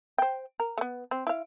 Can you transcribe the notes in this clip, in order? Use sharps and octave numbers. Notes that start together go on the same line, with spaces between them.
C5 G5
A#4
A3 B3
C4
E4 F5